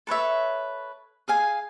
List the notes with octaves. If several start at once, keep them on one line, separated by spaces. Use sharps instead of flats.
A4 B4 C#5 E5
G#4 F5 G#5